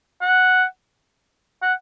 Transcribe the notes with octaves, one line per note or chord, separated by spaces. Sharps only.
F#5
F#5